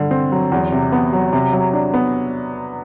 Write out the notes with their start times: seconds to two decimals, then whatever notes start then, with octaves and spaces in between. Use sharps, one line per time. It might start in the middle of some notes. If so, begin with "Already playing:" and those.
Already playing: G2 D3
0.11 C4
0.32 F#3
0.52 E2
0.72 C3
0.92 B3
1.13 F#3
1.33 C3
1.53 F#3
1.73 D4
1.94 B3